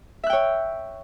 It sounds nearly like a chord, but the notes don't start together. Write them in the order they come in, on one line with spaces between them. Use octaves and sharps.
E5 F#6 G5 C#5